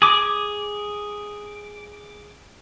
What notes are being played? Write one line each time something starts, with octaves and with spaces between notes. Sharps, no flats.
G#4 D6